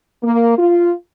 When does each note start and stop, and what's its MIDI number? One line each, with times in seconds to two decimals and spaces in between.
0.23 0.56 58
0.58 0.92 65